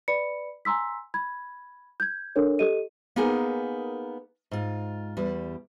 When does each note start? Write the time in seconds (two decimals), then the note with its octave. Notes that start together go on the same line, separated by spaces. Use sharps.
0.08 B4 D5 B5 C#7
0.65 G#5 A#5 C6 E6 B6
1.14 B5 G#6
2.00 G6 G#6
2.36 D4 A4 A#4 C#5
2.59 G4 A4 D#5 D#7
3.16 A#3 B3 D#4 G#4 A#4 G#5
4.51 G#2 F4
5.17 E2 G3